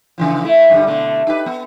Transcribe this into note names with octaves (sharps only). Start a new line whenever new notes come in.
C#3 E3 F3
A3 E4
G2 D3 G3
B2 D3 A3
D#4 G4 B4
B3